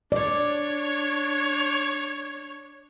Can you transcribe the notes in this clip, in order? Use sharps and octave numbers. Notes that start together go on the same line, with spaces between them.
D4 C#5 D5